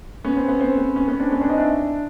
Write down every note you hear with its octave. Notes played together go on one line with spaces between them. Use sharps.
B3 C#4
C4
B3
C4
B3
B3 C#4
B3 C#4
C4 D4
B3 C#4
C4 D4
C#4 D#4
D4 E4